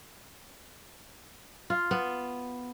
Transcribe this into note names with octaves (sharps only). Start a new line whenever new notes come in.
F4
B3